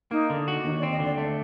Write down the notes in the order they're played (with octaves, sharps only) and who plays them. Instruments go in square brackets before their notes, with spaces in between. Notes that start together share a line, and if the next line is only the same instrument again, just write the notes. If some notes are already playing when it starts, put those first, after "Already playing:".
[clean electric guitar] A#3 [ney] D#4
[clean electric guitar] D3
F#4
[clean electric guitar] D#2 [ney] D#4
[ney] D5
[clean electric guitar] C4
[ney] D#5
[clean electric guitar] D3
[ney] D5
[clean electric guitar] A3